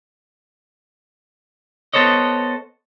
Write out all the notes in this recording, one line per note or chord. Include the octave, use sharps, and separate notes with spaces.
B3 A4 C5 C#5 D#5